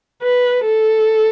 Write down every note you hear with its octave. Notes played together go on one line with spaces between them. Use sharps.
B4
A4